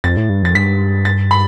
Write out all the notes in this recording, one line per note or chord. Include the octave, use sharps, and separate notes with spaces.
F2 A6
A2
G2
F2 A6
G2 B6
A6
B5